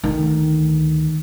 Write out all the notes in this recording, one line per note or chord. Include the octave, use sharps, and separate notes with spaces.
D2 D#3